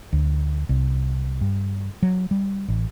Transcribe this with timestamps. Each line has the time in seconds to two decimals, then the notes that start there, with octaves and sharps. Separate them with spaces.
0.13 D2
0.69 C2
1.41 G2
2.03 F#3
2.31 G3
2.68 A1